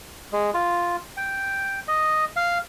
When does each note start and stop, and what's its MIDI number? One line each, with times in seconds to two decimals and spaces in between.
0.33 0.50 56
0.54 0.96 65
1.17 1.80 79
1.88 2.25 75
2.36 2.58 77